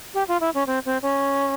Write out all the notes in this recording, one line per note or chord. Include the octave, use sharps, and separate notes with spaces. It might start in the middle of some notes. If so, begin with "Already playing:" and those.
G4
F4
E4
C#4
C4
C4
C#4